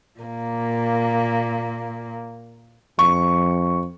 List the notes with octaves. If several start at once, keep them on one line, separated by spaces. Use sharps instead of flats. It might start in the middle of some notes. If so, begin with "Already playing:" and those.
A#2 A#3
F2 C#6